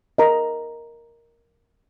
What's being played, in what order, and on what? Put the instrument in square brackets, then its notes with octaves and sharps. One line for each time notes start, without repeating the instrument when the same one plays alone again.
[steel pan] A#4 D#5 A#5